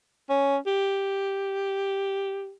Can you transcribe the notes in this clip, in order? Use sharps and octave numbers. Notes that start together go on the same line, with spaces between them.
C#4
G4